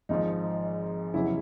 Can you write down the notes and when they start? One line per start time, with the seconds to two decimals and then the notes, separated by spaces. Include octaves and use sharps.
0.09 G#1 G#2 F3 D#4
1.14 F1 E2 C#3 F#3 E4